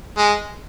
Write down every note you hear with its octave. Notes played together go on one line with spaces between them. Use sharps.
G#3